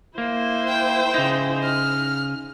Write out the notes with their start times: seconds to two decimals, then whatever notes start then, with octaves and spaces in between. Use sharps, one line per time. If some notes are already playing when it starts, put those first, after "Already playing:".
0.18 A#3 E4 C5
0.68 G5
1.14 C#3 D#4
1.64 F6